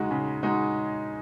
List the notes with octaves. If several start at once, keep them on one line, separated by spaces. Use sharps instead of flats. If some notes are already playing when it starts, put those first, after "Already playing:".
Already playing: C#3 G#3 D#4 F#4
C#3
G#3 D#4 F#4